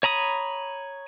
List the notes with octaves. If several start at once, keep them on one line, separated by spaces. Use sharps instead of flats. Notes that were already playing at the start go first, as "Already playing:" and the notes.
C#5 A#5 B5 D#6